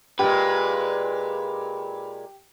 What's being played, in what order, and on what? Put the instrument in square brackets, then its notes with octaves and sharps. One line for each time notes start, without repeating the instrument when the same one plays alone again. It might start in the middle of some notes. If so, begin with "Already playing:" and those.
[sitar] A#2 G#3 [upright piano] G4 [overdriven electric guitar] B4